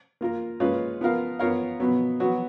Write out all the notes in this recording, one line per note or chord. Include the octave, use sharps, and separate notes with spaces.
A#3 F4 A#4
A#2 G#3 C#4 F4 B4
F3 B3 F4 A#4 F5
B3 F4 A#4 C#5 F5
B2 F#3 B3
F#3 B3 F#4